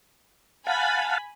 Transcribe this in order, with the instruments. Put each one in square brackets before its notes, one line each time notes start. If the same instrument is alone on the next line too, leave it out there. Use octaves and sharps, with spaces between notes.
[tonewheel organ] F5 F#5 A5 [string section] G#5 B5